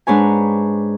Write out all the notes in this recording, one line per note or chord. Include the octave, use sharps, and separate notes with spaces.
G#2 D4 B4 C#5 G#5